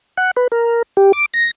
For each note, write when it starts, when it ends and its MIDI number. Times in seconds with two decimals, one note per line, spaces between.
0.17 0.31 78
0.37 0.47 71
0.52 0.82 70
0.97 1.12 67
1.13 1.26 86
1.34 1.51 94